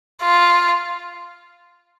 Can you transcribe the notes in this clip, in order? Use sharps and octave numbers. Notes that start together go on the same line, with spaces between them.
F4